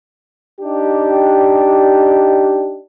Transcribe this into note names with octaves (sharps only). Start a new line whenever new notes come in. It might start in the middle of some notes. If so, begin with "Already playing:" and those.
D4 D#4 G4